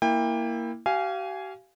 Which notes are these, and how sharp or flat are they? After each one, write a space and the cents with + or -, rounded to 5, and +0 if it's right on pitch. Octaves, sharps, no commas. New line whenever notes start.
A#3 +0 E4 +0 G5 +30
G4 -45 F5 -15 G#5 +0